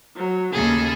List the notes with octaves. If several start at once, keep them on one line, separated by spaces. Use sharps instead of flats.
F#3
D#2 C#3 G#4 A4